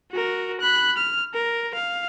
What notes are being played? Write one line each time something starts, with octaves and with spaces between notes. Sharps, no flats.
F#4 A#4
B5 F#6
F6
A#4
F5